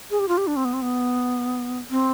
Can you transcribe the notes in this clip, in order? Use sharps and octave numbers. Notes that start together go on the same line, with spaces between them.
G#4
G4
F4
G4
D4
C4
B3
C4
B3
C4